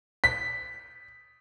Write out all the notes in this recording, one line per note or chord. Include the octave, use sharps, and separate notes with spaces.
B6